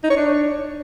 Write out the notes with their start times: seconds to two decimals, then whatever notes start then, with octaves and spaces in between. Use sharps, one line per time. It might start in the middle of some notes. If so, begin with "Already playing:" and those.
0.04 D#4
0.10 C#5
0.17 D4